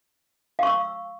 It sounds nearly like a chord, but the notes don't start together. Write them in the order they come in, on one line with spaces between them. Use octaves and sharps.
F5 C#6 E6